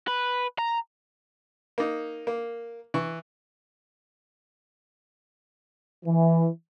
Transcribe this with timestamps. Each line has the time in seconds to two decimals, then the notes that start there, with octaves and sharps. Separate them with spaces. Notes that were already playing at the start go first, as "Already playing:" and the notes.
0.08 B4
0.58 A#5
1.78 A#3 D#4
2.27 A#3
2.94 E3 C#6
6.06 E3